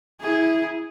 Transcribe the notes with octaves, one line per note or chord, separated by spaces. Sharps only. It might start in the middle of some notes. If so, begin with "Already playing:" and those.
E4 G#4